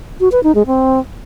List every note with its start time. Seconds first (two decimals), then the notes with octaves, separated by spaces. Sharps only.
0.20 F#4
0.32 B4
0.43 D#4
0.55 G#3
0.66 C4